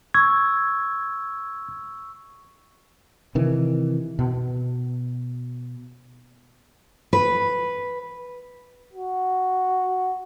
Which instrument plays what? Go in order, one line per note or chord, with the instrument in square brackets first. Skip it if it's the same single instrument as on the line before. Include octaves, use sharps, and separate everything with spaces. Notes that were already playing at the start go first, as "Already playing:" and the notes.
[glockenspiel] C#6 E6 [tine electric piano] G#6
[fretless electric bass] C3 D#3 E3
B2
[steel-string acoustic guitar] B4
[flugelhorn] F#4